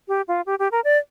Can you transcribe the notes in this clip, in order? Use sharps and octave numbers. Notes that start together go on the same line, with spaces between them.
G4
F4
G4
G4
A#4
D5